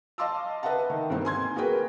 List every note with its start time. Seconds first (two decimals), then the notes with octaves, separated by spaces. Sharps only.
0.18 D#5 F5 A5 C6 D6 E6
0.63 B4 D#5 E5 F#5 A5
0.90 D#3
1.10 G2 B2 D3 A#3 C4 D#4
1.25 G#5 C6 G#6
1.56 A#3 F#4 G#4 A#4 B4 G5